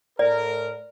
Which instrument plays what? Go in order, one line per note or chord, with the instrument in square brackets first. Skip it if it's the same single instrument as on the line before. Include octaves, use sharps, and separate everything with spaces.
[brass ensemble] A2 A#4 [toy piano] D5